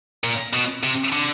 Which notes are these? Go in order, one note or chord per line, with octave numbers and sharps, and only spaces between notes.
A#2
B2
C3
D3